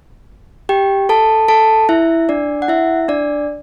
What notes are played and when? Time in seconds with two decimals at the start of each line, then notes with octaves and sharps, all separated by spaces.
0.69 G4 G5
1.09 A4 A5
1.48 A4 A5
1.89 E4 E5
2.29 D4 D5
2.62 F#5
2.68 E4 E5
3.08 D4 D5